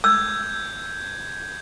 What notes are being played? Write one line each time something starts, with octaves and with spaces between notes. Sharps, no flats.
E6 G6 G#6